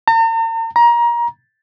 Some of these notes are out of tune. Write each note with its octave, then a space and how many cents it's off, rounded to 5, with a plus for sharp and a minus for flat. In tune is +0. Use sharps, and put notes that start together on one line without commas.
A#5 -45
A#5 +25